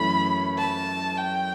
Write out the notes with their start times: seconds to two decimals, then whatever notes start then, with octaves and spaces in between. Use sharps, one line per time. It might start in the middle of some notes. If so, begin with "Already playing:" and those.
Already playing: F#2 E3 A3 C#4 B5
0.58 A5
1.18 G5